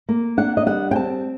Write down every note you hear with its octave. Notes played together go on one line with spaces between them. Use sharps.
A#3
D4 F#5
D#5
G3 F#5
G5
C4 A5